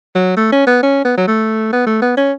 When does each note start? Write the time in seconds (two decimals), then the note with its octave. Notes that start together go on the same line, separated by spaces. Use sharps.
0.15 F#3
0.37 A3
0.52 C#4
0.67 B3
0.83 C#4
1.05 B3
1.17 F#3
1.28 A3
1.72 B3
1.86 A3
2.02 B3
2.17 C#4